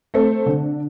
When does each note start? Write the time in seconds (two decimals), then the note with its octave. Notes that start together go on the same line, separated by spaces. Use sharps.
0.14 A3 C4 A4
0.46 D3